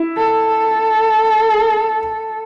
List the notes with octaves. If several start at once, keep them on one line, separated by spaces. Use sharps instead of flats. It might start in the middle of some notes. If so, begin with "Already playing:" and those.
Already playing: E4
A4